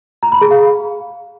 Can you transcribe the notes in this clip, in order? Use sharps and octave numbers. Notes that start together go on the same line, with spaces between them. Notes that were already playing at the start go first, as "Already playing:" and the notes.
A#5
B5
G#4
F5